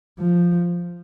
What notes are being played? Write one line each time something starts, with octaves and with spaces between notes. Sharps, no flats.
F3